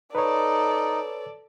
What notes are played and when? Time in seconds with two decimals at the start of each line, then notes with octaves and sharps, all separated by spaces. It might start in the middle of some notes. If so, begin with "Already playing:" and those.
0.15 D#4 A4 B4 C#5 D5